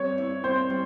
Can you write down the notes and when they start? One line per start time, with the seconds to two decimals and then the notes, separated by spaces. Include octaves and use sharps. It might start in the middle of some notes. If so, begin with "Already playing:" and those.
Already playing: G2 C4 C#5
0.18 E4
0.44 C4 C5
0.70 G3